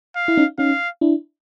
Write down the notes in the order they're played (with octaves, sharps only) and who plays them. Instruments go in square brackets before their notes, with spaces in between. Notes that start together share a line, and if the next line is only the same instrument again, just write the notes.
[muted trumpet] F5
[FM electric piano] E4
C#4 D#4
[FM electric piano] C#4 D#4 [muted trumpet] F5
[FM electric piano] D4 E4